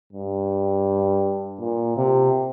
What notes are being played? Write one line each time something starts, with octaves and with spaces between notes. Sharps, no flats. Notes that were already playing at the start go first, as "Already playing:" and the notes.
G2
A#2
C3